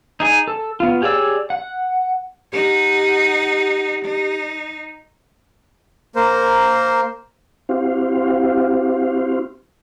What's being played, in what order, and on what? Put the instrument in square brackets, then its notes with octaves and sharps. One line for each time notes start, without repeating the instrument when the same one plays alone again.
[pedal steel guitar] D#4 G#4 G#5
A4
B3 F4
G4 G#4 C#5 D5 E6
F#5
[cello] D#4 F#5 [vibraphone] G4
[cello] D#4
[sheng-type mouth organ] A#3 A#4 C5
[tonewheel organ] C4 E4 F#4 G4 C5 F5